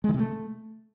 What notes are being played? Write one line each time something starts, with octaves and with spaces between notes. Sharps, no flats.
G#3
D#3
C3
A3